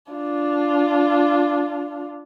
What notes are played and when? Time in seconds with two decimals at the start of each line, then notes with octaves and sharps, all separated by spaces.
0.12 D4 F4